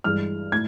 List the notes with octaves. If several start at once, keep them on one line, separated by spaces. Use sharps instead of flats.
G2 E3 G#3 F6
A2 G#6